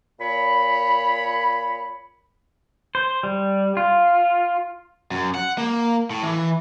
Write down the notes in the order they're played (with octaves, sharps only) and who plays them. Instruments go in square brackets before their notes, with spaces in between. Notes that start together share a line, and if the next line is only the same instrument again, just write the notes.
[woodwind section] A#2 C#5 B5
[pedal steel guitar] C5
G3
F4
[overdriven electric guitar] F#2
F#5
A#3
A2
E3